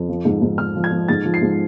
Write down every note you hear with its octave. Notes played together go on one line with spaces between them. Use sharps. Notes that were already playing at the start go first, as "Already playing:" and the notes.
Already playing: F2
F3
G#2
G#2
F3 F6
F3
G#6
F3
G#2 A6
F3
C7
G#2